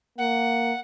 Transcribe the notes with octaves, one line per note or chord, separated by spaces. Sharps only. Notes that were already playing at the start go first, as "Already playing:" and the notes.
A#3 F#5